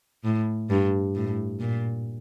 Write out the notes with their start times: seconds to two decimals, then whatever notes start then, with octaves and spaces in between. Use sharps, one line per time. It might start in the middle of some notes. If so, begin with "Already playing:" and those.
0.24 A2
0.70 G2
1.15 A2
1.60 A#2